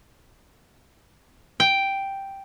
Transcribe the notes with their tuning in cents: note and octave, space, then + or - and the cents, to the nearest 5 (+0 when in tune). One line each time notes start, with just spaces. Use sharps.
G5 +0